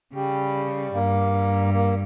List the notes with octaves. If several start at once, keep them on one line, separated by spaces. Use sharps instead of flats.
C#3 G3
G2 A#3
A#3